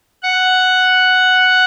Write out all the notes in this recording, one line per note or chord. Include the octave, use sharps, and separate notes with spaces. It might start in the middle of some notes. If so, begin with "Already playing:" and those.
F#5